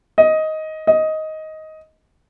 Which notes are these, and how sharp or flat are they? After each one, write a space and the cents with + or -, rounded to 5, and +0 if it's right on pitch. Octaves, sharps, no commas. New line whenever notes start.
D#5 +10
D#5 +10